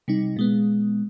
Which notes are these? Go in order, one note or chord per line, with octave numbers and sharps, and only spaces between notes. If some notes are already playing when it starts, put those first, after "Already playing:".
C3 G3 D#4
A#2 G#3 B3